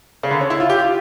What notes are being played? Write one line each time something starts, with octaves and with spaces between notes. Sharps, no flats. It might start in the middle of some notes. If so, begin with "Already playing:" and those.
C#3
D3
C#4
E4
F4
G4
F4